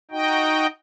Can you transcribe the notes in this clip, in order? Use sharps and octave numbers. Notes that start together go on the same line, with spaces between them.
D#4 F#4 D#5 G5